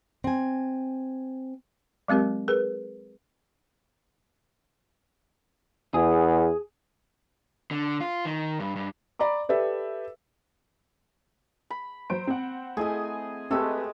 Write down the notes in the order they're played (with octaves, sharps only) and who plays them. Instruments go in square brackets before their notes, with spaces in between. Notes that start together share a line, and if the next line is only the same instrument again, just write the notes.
[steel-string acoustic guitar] C4 G#5
[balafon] F#3 G#3 C4 G4 A#4
G#4 A#4 B4
[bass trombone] E2 [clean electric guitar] G#4
[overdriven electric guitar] D3
F4
D#3
G2
G2
[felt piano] D5 A#5 B5 D6
G4 A4 B4 D5 E5
[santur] B5
[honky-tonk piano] F#3 C5 D7
C4 F#5
[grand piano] A3 E4 [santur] G#4 D#5 G#5
[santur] G#3 A3 [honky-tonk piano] C4 G4 B4 [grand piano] A4 E6